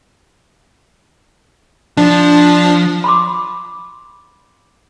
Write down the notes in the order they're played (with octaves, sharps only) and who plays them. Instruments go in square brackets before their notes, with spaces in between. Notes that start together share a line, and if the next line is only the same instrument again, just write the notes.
[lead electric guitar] F3 [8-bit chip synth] D4
[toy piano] B5 C6 D6